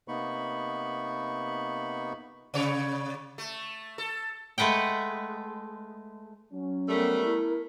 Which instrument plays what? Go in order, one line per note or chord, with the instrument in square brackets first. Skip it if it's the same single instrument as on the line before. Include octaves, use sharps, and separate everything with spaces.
[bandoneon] C3 A#3 B3 D#4 B5 C#6
[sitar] C3 C#5
A3
A4
[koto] G#3 A3 B4 F#5 G5
[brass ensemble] F#3 C#4
[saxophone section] G3 A3 [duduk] B3 [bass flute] A#4
[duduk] E4